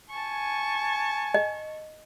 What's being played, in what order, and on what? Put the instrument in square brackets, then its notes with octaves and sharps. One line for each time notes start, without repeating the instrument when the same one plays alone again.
[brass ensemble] G#5 [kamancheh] A5 C#6
[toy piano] D#5